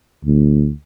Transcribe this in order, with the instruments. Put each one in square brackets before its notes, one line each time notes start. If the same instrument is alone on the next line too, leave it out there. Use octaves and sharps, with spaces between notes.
[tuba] D2